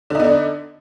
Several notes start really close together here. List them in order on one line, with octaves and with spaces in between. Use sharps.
D3 D#4 B3 D4